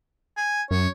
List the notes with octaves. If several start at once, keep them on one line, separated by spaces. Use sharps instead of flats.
G#5
F#2 C#5